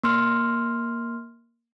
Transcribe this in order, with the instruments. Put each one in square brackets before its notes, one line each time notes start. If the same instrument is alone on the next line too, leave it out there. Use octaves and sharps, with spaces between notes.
[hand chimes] A#3 C6 F6